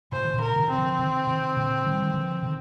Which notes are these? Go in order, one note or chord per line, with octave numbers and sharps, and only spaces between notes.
A2 C3 C5
D#3
A#2 D3
A#4
C3 D#3
C4
D3 F3
C3 D#3
C3 D#3
A#2 D3
D#3 G3
D#3
D3 F3
C3 D#3